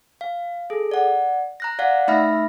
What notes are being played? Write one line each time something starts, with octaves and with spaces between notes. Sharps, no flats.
F5
G#4 A4
D5 F#5
A#5 F#6 A#6
D5 F5 F#5 F#6
A3 D#4 E5 B5 F6 A#6